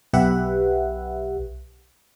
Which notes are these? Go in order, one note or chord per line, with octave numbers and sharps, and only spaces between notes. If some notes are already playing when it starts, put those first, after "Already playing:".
B1 G4 B4 E5 F#5